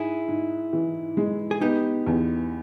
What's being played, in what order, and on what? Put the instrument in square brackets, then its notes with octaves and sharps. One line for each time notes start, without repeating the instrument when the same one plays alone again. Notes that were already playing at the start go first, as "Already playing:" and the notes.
Already playing: [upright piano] G#2 [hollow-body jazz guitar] E4 G#4
[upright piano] G#2
E3
G#3
[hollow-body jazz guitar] G#4
[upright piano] B3 [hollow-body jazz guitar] D#4 G4
[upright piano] E2